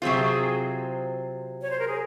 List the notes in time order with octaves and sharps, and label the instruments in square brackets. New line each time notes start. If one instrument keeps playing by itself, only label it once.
[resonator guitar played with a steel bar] C3 F#3 C4 F4 [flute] G#4
[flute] C#5
C5
A#4
G#4